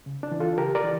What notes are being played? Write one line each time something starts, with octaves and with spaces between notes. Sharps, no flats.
C#3
D4
E3
F4 A4
C#3 G4 A#4
A#4 D5
E3